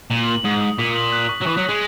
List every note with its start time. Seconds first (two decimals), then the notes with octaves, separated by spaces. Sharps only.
0.11 A#2 F#7
0.28 F#7
0.45 G#2 D#6
0.61 D#6
0.79 A#2 B6
0.96 F#7
1.12 F#6
1.29 C#6
1.41 F#3
1.46 E3 C#6
1.57 F#3
1.63 C#6
1.68 G#3